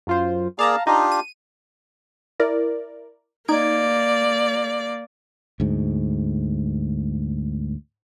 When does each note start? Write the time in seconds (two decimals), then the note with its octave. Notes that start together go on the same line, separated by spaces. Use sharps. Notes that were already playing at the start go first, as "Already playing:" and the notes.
0.07 F#2 F4 C5
0.59 A#3 G#4 D5 F5 A5 A#5
0.87 D4 D#4 F4 G4
1.12 D#7
2.40 E4 A#4 D5
3.48 A#3 D#4 D5 G#6 D7
5.60 D2 G#2